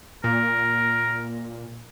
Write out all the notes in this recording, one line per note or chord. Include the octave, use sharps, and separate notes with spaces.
A#2 A#4